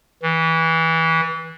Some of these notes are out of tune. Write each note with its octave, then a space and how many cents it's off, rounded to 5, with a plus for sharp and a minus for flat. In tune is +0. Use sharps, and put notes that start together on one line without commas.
E3 -20